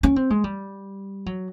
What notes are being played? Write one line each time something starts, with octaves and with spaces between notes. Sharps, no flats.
C#4
C4
G#3
G3
F#3